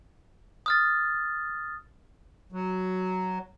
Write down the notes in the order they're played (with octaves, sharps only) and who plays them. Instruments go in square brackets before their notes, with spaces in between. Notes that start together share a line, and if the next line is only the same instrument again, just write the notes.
[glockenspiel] D#6 F6 A6
[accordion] F#3